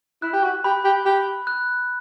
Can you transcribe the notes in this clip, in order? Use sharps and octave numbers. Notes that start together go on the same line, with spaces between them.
E4 F#6
G4
F#4
G4 B5
G4
G4 B5
F#6